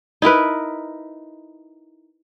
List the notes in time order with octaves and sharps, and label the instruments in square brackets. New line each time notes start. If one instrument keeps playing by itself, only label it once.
[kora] D#4 E4 A#4 B4